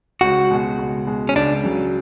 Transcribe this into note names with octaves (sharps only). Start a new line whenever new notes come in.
C#2 F#4
B2 G#3
C#2
B2 G#3
C#4
C#2 D4
C#3 F#3